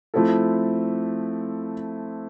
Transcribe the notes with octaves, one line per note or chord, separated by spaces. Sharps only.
F3 A3 C4 E4 A4